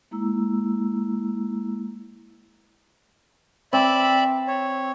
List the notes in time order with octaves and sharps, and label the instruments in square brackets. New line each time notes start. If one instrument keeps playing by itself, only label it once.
[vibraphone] G#3 A#3 E4 A#5 E6
[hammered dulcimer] C4 [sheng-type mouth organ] D5 E5 B5
[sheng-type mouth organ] C#5